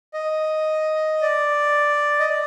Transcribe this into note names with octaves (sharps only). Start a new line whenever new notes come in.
D#5
D5
D#5
D5